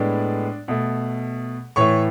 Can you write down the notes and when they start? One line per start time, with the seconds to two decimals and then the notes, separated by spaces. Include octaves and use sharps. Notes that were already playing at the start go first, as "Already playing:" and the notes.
Already playing: A2 G#3 B3 D4 D5
0.68 B2 A3
1.76 A2 E3 A3 C#5 C#6